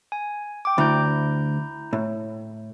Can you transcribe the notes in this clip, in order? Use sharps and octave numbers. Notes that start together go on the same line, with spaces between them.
G#5
G5 D6
D2 E4 A#5 G6
A2